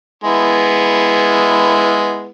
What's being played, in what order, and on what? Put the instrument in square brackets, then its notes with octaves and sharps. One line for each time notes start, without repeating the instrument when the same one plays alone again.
[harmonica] G#3 B3 E4